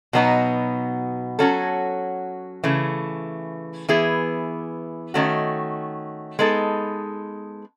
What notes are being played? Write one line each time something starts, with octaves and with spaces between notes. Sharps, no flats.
B2 F#3 B3 D#4 F#4
F#3 C#4 F#4 A4
C#3 E3 A3
E3 B3 E4 G#4
D#3 A3 C#4 F#4
G#3 B3 D#4 A4